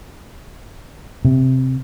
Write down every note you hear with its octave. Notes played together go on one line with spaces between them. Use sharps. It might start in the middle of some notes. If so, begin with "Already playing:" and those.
C3